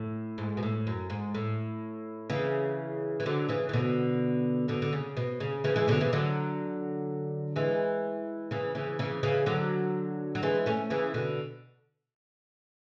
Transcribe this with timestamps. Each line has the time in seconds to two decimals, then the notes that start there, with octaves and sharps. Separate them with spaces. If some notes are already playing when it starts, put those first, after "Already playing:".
Already playing: A2
0.38 G#2
0.57 B2
0.63 A2
0.87 F#2
1.10 G#2
1.34 A2
2.30 C#3 E3
3.20 E3
3.26 D3 F#3
3.49 C#3 E3
3.69 E3
3.73 B2 D3
4.68 B2 D3
4.82 D3
4.93 C#3
5.17 B2
5.40 C#3
5.64 C#3 E3
5.76 E3 G#3
5.88 B2 D3
6.01 C#3 E3
6.13 D3 F#3
7.56 E3 G#3
8.51 C#3 E3
8.75 C#3 E3
8.99 C#3 E3
9.23 C#3 E3
9.46 D3 F#3
10.35 F#3
10.43 E3 G#3
10.66 A3 C#4
10.90 C#3 E3
11.14 B2 D3